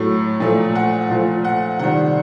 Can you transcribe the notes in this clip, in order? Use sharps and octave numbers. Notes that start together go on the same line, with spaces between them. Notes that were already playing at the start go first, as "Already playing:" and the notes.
Already playing: A2 F#3 A3
A#2 F3 A3
F#5
A#2 F3 A3
F#5
C3 D#3 G3 F#5